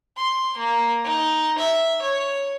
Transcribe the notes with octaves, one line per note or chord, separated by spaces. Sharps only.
C6
A#3
D#4
E5
C#5